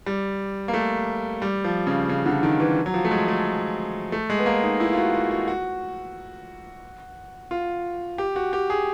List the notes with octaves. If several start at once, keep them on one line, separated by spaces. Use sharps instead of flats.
G3
A#3
A3
G3
F3
C#3
C#3
D3
D#3
E3
F#3
F3
A3
G#3
A3
A3
G#3
B3
A#3
D#4
E4
F4
F#4
F#4
F#4
F#4
F4
G4
F#4
G4
G#4